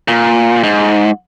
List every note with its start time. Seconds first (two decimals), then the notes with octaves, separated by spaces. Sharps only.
0.08 A#2
0.64 G#2